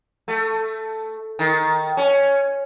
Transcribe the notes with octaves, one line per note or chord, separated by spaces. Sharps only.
A3
D#3
C#4